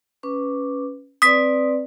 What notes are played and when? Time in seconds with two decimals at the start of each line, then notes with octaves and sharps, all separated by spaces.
0.23 C#4 B4 D6
1.22 C4 B4 D5 D#6 B6